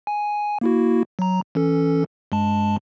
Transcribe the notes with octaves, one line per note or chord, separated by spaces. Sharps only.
G#5
A#3 E4 F#4
F#3 A#5
E3 C#4 A4
G2 G#3 A5